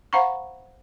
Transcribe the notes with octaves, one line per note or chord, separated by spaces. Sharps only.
C5 F5 F#5 A#5 B5 C#6